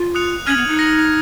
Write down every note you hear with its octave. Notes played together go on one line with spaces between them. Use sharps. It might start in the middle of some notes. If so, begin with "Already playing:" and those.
Already playing: F4
D#6 F#6 C#7 F7
C#4 F6 G#6 D#7 F#7
B3
D#4
D#6 A#6 C#7 F#7